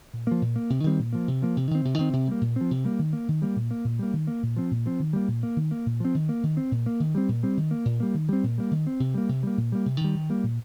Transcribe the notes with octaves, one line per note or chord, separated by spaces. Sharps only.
A#2
F3 A#3
A#2
A#3
C3
D#3 G3 C4
A#2
F3 A#3
C3
F3 A#3
C3
D#3 C4
C3
D#3 C4
C3
G3 A#3
A#2
F3 C4
C3
G3 A#3
D#3
A#3
D#3
G3 A#3
A#2
A#3
A#2
G3 A#3
D#3
A#3
A#2
F3 C4
A#2
F3 C4
D#3
G3 A#3
A#2
A#3
D#3
A#3
A#2
F3 C4
D#3
A#3
D#3
C4
A#2
A#3
D#3
G3 C4
A#2
G3 C4
D#3
A#3
A#2
G3 A#3
D#3
G3 C4
A#2
G3 A#3
D#3
C4
C3
G3 A#3
C3
G3 A#3
A#2
G3 A#3
C3
D#3 G3
D#3
G3 A#3
A#2